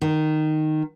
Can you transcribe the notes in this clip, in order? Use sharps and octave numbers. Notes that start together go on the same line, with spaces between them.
D#3